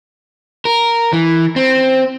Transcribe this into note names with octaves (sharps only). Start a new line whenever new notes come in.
A#4
E3
C4